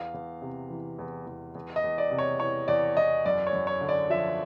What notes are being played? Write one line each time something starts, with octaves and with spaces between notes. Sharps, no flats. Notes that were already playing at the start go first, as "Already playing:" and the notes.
Already playing: E2 F5
E2
C3
E3
E2
E2
E2
D#5
E2
D5
C3
C#5
E3 C#5
E2 D5
E2 D#5
F#2 D5
C#5
F#2
C#5
D3
D5
F3 E5